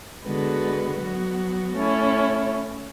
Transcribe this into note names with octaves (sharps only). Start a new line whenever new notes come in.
D3 G#3 B3 F#4 B4
F#3 B3 F#4
A3 C#4 E4